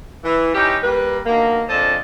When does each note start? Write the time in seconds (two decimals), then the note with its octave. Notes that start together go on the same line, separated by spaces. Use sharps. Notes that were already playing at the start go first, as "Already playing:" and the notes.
0.23 E3
0.54 E3 C#4 D#4 G4
0.83 G3 A#3 B4
1.26 B2 D3 D#3 A#3
1.68 F2 C#3 D4 A4 C5 D#5